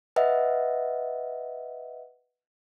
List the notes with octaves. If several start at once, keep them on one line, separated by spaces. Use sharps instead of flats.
B4 D#5 E5 F#5